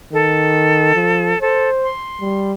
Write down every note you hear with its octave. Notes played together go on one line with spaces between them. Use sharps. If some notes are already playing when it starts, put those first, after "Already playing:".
D#3 A4
F3
A4 C5
C6
G3